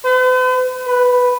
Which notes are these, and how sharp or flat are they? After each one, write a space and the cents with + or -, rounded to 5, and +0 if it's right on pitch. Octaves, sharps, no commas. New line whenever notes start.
B4 +45
B4 +0